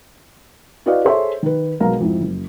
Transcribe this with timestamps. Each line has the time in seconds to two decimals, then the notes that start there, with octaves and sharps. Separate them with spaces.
0.86 E4 F#4 B4 D5 D#5 F5
1.04 G#4 A4 C5 C#5 E5 C6
1.43 D#3 B4
1.80 B1 B2 G#3 A#4 F5 A#5
2.00 F2 G#2 E4
2.21 F#1